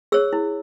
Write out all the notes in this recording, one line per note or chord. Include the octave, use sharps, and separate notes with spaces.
G#4 C#5 E6
E4